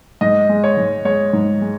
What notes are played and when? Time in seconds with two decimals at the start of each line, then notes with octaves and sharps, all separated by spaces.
0.21 G#2 D#5
0.49 G#3
0.64 C#5
0.77 G#2
1.05 G#3 C#5
1.33 G#2
1.62 G#3